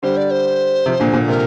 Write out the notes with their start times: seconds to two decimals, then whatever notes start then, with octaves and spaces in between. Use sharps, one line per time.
0.03 D3 G3 C5
0.17 D5
0.31 C5
0.86 C3 F3
1.00 A#2 D3
1.13 A#2
1.28 C3 A#4